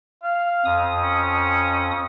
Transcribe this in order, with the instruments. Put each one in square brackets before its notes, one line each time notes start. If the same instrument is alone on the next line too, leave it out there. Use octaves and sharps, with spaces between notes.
[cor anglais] F5
[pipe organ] F2 D#6
[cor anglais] C#4